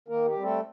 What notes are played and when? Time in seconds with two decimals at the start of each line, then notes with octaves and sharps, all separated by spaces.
0.08 D#3 A#3 A#4
0.25 G4
0.34 G3 C4
0.43 A3 A4